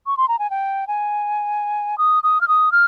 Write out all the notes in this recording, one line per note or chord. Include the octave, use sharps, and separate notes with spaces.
C#6
C6
A#5
G#5
G5
G#5
D#6
D#6
F6
D#6
F6